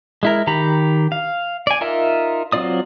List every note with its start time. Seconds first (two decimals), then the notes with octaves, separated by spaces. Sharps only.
0.23 G#3 E4 A#4
0.47 D#3 G4 A#5 B5
1.12 F5
1.67 D5 G#5
1.81 D#4 F4 A#4 E5
2.52 F#3 C4 F4 D5 D#6